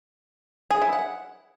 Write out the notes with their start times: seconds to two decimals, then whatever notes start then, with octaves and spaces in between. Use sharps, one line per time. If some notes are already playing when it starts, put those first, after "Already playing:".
0.71 G#4
0.82 E4
0.93 F#5